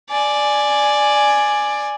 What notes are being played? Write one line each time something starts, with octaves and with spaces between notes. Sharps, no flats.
D5 G#5